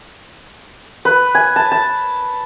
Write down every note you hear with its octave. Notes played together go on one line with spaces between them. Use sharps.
B4
G#5
A5
A5